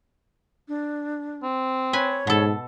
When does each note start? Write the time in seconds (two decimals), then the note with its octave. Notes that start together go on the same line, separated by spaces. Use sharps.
0.68 D4
1.43 C4
1.93 B4 C#5 G#5
2.27 G#2 B2 A4